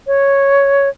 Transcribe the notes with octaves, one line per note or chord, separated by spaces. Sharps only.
C#5